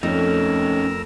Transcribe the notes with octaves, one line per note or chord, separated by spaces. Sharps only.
F2 A3 C#4 D#4 A#4 E6